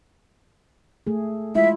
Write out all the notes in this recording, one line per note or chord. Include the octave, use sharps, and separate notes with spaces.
A3 G#4
G#3 E4 F4 E5